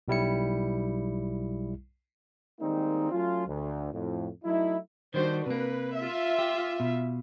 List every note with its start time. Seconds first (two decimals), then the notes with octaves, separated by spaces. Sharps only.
0.08 B1 G3 E4 C#7
2.60 D#3 G3 G#3 A#3 C4 D#4
3.12 F#3 A3 C#4 F4
3.47 D2
3.92 F2 A2
4.45 F#3 A3 D#4 E4
5.14 D#3 G3 D4 F#4 C5
5.46 C3 A#3 B4
5.99 F4 E5
6.39 G4
6.80 B2